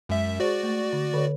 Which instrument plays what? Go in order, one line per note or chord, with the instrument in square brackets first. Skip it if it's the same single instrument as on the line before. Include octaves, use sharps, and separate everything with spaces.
[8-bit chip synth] F#2 E5 [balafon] G#3
[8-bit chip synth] F#4 D5 [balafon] G#4 C5
[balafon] A3
D3
D3 A4 C#5